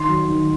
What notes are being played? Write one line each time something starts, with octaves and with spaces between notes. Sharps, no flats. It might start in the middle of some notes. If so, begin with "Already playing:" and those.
Already playing: D#3 C6
F#3
D#3